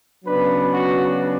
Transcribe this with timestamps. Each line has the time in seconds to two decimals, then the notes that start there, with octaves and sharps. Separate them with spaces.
0.25 C#3 F#3 B3 D4 B4
0.72 F#4